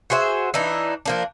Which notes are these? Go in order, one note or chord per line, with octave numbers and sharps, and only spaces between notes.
F#4 G#4 C5 E5
E3 D4 D#4
F3 A#3 D4